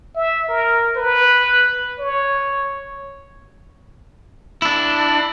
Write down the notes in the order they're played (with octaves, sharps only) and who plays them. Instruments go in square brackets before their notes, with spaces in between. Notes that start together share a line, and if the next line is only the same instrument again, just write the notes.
[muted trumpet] E5
A#4
B4
C#5
[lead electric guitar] D4 E4